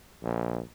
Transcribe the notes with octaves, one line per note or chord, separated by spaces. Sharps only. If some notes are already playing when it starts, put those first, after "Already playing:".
A#1